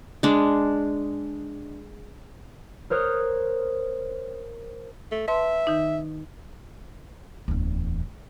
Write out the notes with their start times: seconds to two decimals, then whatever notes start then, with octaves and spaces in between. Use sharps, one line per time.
0.23 G#3 D4
2.90 A#4 C5 C#5 D#6 F6 F#6
5.11 A3
5.28 B4 E5 A5 C6
5.67 D#3 D#4
7.48 D1 E2